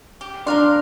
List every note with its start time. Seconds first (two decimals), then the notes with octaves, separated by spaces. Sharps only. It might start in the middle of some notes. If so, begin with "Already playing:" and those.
0.21 G4
0.46 D4 A#4 F5 C6